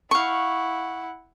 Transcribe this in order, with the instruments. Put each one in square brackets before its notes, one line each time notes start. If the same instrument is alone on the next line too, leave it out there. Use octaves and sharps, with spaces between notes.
[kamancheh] E4 F#5 [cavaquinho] F5 C#6